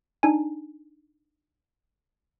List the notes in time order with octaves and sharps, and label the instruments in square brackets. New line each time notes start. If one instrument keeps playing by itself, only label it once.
[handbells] D4 D#4 G#5